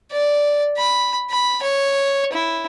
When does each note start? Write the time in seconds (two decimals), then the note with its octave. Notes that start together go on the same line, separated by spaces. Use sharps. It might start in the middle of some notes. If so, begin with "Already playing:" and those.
0.12 D5
0.78 B5
1.30 B5
1.62 C#5
2.33 E4